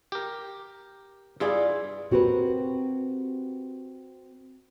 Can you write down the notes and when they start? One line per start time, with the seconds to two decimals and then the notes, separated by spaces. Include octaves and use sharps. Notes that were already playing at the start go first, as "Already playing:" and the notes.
0.12 G4 A#4
1.40 G2 E4 F4 G#4 D5
2.11 C4 F#4 G4 A#4 B4